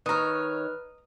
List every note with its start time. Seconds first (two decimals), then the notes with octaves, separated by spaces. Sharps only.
0.06 D#3 B4 C#5 D#5 A#5 F6